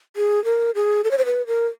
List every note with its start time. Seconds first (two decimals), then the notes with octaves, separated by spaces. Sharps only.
0.16 G#4
0.45 A#4
0.75 G#4
1.04 A4
1.11 C#5
1.18 C5
1.25 B4
1.47 A#4